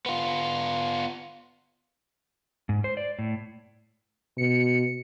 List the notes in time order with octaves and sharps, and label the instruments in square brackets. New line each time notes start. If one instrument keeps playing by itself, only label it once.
[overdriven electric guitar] B3 F4
[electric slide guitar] G#2
C5
D5
A2
[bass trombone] B2 [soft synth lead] C#7